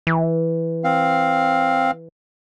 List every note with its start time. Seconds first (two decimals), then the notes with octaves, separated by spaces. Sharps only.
0.07 E3
0.84 C4 F5